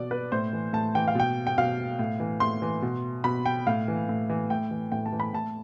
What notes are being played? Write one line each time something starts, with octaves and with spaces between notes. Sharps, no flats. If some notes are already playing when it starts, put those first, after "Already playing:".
Already playing: B2 D5
B4
A2 C5
E3
A2 A5
E3 G5
F5
B2 G5
G5
B2 F5
A2
E3
A2 C6
E3
B2
B2 B5
G5
A2 F5
E3
A2
E3
A2 G5
E3
A2 G5
A5
E3
B5
A2 A5